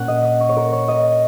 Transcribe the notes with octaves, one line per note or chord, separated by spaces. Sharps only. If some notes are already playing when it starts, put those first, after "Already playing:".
Already playing: A#2 A#3 C#4 F#5
D#5
D#6
C#6
C#5
A#4
C#5
D#5